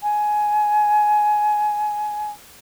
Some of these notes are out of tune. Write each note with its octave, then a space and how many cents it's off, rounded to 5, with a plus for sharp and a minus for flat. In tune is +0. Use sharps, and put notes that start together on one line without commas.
G#5 +15